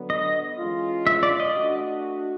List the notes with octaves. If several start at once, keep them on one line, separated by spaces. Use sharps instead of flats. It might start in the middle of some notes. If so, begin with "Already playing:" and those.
Already playing: D3 F#3 B3
D#5
E3 G#3 C#4 F4
E5
D5
D#5
A3 D4 F#4